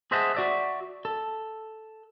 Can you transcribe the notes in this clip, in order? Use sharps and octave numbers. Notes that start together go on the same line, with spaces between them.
G#4 C5 D#5 E5 F#5 A5
F#4 D5 E5
A4